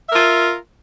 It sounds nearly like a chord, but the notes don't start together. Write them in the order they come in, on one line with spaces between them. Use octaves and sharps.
E5 A#4 F4